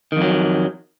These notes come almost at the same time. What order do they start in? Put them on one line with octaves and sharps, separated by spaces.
D#3 F2 F#3